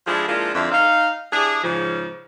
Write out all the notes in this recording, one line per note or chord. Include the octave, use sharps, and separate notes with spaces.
F3 G#3 D4 E4 F4 G#4
F3 G#3 A#3 D4 E4 F4
F2 D3 F3 C4 D4 E4
D#4 F5
D4 E4 G4 G#4
G#2 C#3 F3